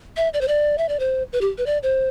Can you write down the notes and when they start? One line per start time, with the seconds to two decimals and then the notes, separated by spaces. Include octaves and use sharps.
0.17 E5
0.34 D5
0.41 C5
0.48 D5
0.78 E5
0.89 D5
1.00 C5
1.33 B4
1.41 G4
1.58 B4
1.66 D5
1.83 C5